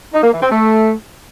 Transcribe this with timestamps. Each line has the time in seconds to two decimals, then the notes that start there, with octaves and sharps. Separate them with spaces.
0.13 D#4
0.23 A#3
0.32 E3
0.41 C4
0.51 A3